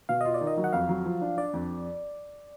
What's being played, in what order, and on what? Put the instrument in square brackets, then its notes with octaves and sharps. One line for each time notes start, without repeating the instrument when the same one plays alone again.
[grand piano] B2 [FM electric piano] F5
[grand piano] F4 [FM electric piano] D#5
[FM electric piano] D5
[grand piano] D#3
[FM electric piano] D#5
[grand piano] F#3
[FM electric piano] F#5
[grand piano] F2 [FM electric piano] F5
[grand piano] F#3
F3
D4
[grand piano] D4 [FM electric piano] D5
[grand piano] F2